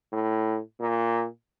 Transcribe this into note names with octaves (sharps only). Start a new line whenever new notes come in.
A2
A#2